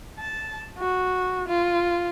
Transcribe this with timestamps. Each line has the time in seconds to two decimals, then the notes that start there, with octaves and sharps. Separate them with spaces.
0.18 A5
0.78 F#4
1.48 F4